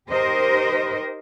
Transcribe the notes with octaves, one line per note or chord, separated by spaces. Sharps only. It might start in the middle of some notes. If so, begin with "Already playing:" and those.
D#4 G4 A#4 C5 D#5